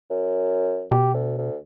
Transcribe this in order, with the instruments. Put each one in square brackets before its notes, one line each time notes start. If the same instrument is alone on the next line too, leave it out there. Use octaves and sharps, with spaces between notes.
[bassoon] F#2
[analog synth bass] B2 [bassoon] G4
[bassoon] D2
D2